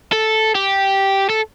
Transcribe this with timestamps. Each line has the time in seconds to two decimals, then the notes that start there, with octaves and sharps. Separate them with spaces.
0.13 A4
0.55 G4
1.29 A4